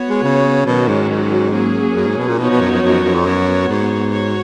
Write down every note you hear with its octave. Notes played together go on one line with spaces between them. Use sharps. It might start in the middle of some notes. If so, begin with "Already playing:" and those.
Already playing: B3 F#4 C#5
G#3
C#3
B2 D#3 F#3 C#4 F#4
G#2
G#2
F#3 A#3 C#4 G#4
F#2
G#2
B2
A#2
B2 F3 B3 D#4 F#4 C#5
B2
F#2
F#2
F#2
F#2
F2
F#2 B3 F#4 C#5
G#2
F#4 C#5